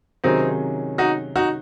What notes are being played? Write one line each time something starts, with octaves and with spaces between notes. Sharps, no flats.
C3 D#3 F#3 C4 C#4 D#4 G#4
D#4 F#4
D#4 F#4